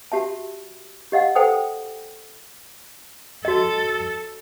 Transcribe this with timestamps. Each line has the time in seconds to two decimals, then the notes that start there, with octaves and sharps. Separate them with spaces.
0.12 F#4 G4 E5 A5
1.12 G4 D#5 F5 F#5
1.35 A4 C5 F#5 G5 A5 D#6
3.45 F#4 A4 D#5